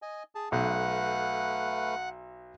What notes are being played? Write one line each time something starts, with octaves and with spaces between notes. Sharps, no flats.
D#5 G#5
G#4 A5
B1 A3 B4 F5 F#5